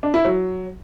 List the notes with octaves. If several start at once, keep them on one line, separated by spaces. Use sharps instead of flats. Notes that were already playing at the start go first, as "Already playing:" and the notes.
D4
E4
F#3